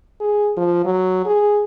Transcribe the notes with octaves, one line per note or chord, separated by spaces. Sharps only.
G#4
F3
F#3
G#4